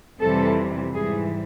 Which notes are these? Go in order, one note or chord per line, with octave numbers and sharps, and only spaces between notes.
F2 C3 E3 G3 A4
G#2 E3 G3 G#4